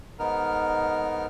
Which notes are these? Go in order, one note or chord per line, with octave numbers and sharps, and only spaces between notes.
G#2 B3 D#4 A#4 F6